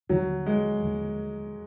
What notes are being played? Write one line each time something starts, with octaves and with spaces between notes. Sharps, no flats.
D#2 D3 F3 F#3
G#3
D#2 D3 F3